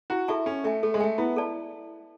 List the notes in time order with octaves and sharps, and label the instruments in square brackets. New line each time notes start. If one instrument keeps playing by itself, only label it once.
[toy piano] E4 [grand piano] F#4
[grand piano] E4 [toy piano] A4 E5 A5 C#6
[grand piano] C#4 [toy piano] A4
[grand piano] A3 [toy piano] E5 G#5
[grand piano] A3 [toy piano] A4
[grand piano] G#3
[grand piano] A3 [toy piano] E5 G#5
[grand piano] B3 [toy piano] E4
[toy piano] A4 D5 A5